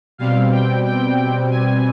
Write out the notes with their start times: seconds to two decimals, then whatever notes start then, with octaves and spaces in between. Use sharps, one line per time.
0.18 B2 G3 C4 F5
0.52 G5
0.86 G5
1.51 G#5